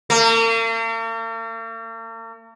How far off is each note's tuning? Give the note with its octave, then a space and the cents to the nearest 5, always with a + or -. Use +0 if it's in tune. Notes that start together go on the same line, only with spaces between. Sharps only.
A#3 -45